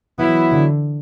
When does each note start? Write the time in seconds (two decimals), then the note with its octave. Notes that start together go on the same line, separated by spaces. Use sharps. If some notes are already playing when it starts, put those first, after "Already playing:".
0.19 E3 F#3 B3 E4
0.52 D3